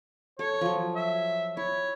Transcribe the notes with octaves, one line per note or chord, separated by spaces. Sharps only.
A4 C#5
F3 F#3
E5
E4 C#5